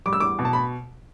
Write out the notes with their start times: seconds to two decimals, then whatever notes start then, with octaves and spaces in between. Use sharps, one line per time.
0.06 G3 D6
0.13 E6
0.20 E2 D6
0.39 B2
0.45 A5
0.53 B5